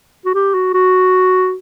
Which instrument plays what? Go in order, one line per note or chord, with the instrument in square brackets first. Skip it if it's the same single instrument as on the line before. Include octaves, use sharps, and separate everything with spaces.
[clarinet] F#4
G4
F#4
F#4